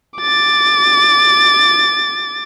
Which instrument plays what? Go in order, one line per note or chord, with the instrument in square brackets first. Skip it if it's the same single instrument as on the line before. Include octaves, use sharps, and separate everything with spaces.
[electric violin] D6 A6